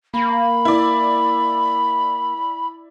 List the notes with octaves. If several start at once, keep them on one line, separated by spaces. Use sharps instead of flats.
A#3 B5
E4 D5